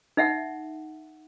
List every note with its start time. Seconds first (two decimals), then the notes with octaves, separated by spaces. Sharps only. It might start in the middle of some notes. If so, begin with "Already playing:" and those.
0.17 D#4 E5 F#5